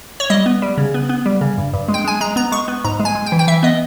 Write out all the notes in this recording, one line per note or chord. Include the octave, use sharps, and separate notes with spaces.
C#5
G3 D#5
B3
G3
C#3
B3
B3
G3
C#3
G2
G2
G#3
G5
G#3 G#5
G#3 A#5
B3 A#5
G#3 C#6
B3
G#2 A#5
G#3
G#5
G#3
G5
E3
G5
E3 E5
B3 D#5